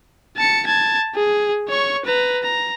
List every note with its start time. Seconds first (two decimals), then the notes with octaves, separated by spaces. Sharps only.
0.37 A5 C#7
0.66 A5 G#6
1.15 G#4
1.68 C#5 C#6
2.05 B4 A#5
2.43 A#5